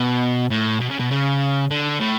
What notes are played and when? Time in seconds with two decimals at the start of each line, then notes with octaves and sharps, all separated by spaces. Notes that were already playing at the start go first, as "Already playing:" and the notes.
Already playing: B2
0.51 A2
0.81 B2
0.91 C#3
1.00 B2
1.11 C#3
1.71 D3
2.00 A2